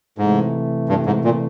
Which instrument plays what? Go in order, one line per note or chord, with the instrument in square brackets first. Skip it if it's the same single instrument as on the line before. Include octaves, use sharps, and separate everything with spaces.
[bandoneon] G#2 [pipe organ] C3 E3 A3
[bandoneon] G2
G#2
A#2